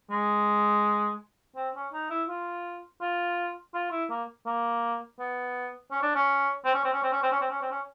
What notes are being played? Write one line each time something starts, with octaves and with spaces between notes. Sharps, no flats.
G#3
C4
C#4
D#4
E4
F4
F4
F4
E4
A#3
A#3
B3
C#4
D4
C#4
C4
C#4
C4
C#4
C4
C#4
C4
C#4
C4
C#4
C4
C#4